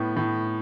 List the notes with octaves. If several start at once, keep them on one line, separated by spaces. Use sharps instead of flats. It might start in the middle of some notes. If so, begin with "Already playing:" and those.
Already playing: A2 B3
A2